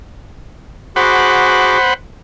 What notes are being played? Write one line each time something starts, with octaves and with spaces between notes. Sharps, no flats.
F#4 G#4 C5 F#5 B5 D6